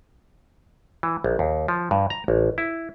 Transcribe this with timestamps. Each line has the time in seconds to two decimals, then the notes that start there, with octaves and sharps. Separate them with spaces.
1.03 E3
1.24 A#1
1.39 D#2
1.68 F3
1.91 G2
2.10 A#5
2.28 A1
2.58 E4